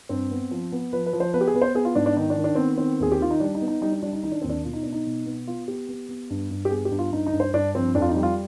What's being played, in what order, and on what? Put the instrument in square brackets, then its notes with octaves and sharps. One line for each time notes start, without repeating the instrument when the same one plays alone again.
[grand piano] G2 C4
B3
F3
B3
F3 B4
B4
F3
C5
B3 B4
G4
G#4
B3 B4
C5
B3 G#4
F4
G#2 D4
D4
D#3 D#4
D4
D#3
D4
B3 C4
D#3 C4
D#2 G#4
G4
D#3 F4
D#4
G3 D4
D#4
B3
D#4
G3 D#4
D4
G3 D4
D#4
D#3 D#4
D4
D#2 C4
D4
B2 F4
D#4
B3 D4
D#4
B2
B3
B3 F4
B3 G4
B3
B3
G2
G2
G4
B3 G#4
G4
G2
F4
G2 D#4
D#4
G2
C5
G2 D4
F3 C4
F2 D4
F4
D#4
G3
F4